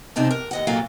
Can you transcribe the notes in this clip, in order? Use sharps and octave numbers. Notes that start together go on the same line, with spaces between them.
D2 C3 D4 D#4 A5
A#4
D#2 D#5 F#5
D2 A#2 F#3 A#3 A4 F5